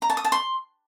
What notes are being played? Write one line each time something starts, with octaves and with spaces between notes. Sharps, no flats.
A#5
A5
D#6
A5
C6